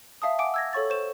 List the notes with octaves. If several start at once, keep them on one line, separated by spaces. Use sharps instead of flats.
E5 F5 A5 D#6
F#5 G#5 D6 D7
E6 G#6 A#6
A4 C#5 C#6 A6
C5 C#6 E7